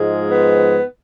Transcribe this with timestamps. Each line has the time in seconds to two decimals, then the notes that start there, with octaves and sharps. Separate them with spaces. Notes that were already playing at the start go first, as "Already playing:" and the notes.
Already playing: G#2 F3 G#3
0.30 B3